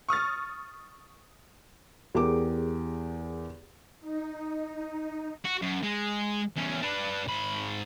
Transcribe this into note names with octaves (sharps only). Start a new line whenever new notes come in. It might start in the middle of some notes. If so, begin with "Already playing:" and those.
C#6 D#6 F6 A6
E2 G4 G#4 A#4 D6
D#4
F#4
F#2
G#3
E2 C#4
D4 B4
G#2 B5